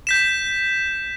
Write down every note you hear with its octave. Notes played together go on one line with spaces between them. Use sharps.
G6 B6 E7